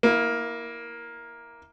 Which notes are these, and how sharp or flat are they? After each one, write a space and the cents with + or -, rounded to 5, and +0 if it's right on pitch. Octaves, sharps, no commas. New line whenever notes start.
A#3 +10 E4 -15